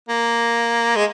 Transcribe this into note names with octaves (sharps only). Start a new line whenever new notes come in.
A#3
G#3